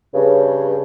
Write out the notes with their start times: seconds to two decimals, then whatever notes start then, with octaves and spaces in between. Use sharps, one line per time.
0.14 G2 C#3